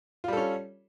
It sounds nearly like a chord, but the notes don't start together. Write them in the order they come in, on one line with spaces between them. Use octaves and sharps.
F4 G3 A4 C#4